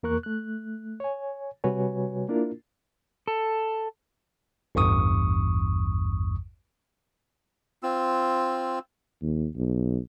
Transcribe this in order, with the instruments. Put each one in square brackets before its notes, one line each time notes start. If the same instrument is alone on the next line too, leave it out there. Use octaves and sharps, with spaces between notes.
[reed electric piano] E2 A#3 A#4 C#6 F#6
A3 F#6
C#5 G#5
C3 G3 F#4 B4 C#5 G#5
A#3 D4 E4 F4 A#4
[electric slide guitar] A4
[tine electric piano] A1 E2 G2 C#6 D#6
[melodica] C4 F4 E6
[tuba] D#2
B1